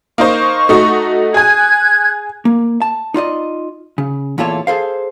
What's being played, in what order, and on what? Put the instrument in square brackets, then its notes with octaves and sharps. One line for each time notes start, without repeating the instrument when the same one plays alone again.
[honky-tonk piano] A#3 D#4 C5 [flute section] C#6
[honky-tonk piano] A3 D#4 F#4
[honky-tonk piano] G#4 G#5 [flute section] F#6 G#6
[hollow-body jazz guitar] A#3
A5
D#4 F4 D5 D#5
C#3
E2 A#2 E4 F4 A4 C#5
G#4 A4 C5 F5